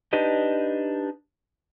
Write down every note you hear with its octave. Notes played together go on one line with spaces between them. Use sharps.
D4 D#4 G4 B4 D#5